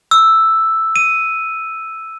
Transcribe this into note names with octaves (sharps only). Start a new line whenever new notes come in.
E6
D#7